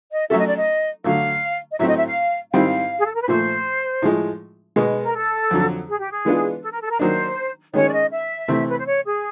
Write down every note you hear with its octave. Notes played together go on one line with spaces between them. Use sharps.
D#5
F#3 A3 C#4 F#4 A4 E5
D#5
D5
D#5
D3 F#3 A3 F5
D#5
A2 F#3 A3 C4 E5
D#5
E5
F5
G#2 D#3 G3 C4 E4 F5
G#4
A4
A#4
B4
A#2 F3 A3 C5
A2 F3 G#3
B2 G#3 B3
A#4
A4
F2 D3 F#3
G#4
G4
G#4
E3 G#3 B3 D4 F4
A4
A#4
A4
A#4
D#3 F#3 A#3 D4 C5
D#3 G#3 C#4 C#5
D5
D#5
E5
C3 E3 A3 C4
B4
C5
C#5
G#4